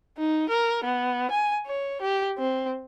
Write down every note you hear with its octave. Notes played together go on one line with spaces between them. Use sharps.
D#4
A#4
B3
G#5
C#5
G4
C4